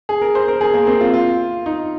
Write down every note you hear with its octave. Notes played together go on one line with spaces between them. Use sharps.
G#4
A#4
C5
A#4
G#4
A#3
C4
F4
F4
D#4